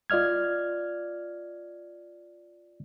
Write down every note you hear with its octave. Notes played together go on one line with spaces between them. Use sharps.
F4 D5 D#5 F6 G#6